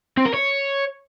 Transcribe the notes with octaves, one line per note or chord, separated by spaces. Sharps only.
C4
A#4
C#5